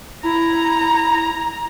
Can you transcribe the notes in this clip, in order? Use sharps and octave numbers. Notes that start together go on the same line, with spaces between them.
E4 A#5